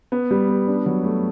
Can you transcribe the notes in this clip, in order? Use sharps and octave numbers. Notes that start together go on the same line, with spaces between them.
B3
G3
B3
D4
F#3
A3